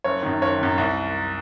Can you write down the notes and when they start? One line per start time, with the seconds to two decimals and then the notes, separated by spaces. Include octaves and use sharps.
0.04 F#1 C#5
0.23 F#2 D#3
0.41 F#1 C#5
0.59 F#2 D#3
0.78 C2